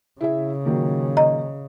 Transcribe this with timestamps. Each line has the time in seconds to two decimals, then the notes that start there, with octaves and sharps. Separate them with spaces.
0.21 C#3 E4 G#4 E5
0.65 A#2 D#3 F#3
1.17 D#5 A#5